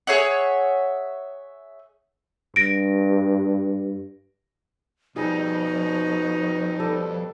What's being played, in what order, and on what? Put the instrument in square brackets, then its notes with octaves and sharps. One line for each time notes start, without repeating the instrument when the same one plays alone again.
[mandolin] G#4 C#5 E5 F#5
[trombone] G2 [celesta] A#6 D7
[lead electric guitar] F2 [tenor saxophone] B2 [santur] G3 G#4 D#6 [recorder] D#4
[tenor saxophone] B2 [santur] G3 A4 A5